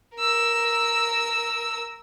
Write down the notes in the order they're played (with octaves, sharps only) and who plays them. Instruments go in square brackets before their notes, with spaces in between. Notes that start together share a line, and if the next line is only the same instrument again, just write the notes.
[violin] A#4 E6